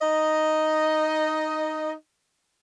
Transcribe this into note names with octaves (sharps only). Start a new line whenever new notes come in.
D#4 D#5